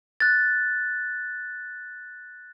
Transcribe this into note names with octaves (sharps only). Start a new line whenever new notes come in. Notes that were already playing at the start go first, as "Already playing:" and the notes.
F#6 A6